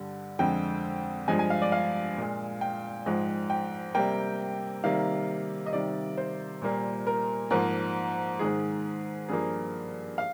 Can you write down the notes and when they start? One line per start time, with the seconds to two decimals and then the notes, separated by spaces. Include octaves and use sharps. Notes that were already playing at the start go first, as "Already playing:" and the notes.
Already playing: G2 D3 G3
0.39 F2 D3 G#3 G5
1.28 G2 F3 G#3 G#5
1.39 G#5
1.50 F5
1.62 D5
1.72 F5
2.17 A#2 G#3
2.61 G5
3.06 G#2 F3 G#3
3.50 G5
3.95 C3 G3 A#3 G5
4.84 C3 D#3 G3 A#3 F5
5.66 D#5
5.73 C3 D#3 G3 D5
6.17 C5
6.62 A#2 G3 A#3
7.07 A#4
7.51 G#2 F3 A#3 A#4
8.39 G#2 D#3 G#3 G#4
9.29 G2 F3 A#3 G#4
10.18 F5